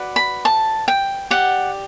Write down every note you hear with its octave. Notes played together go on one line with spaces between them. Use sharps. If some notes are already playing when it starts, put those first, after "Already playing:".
Already playing: F#4 B4 D5
B5
A5
G5
G4 D5 F#5